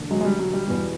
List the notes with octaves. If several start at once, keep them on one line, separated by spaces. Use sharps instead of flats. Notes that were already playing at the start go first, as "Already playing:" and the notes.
Already playing: E1 D#2 D3
F#3 G#3
G#3
G3
F#3
G3
E2 B2 G3